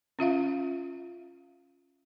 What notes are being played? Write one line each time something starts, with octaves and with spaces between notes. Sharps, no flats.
C#4 F4 E5 F5